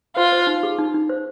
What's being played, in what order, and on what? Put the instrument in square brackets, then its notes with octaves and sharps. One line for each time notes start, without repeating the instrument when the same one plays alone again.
[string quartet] F4 [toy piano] C5
[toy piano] C5
D#4
G#4
D#4
D#4
C5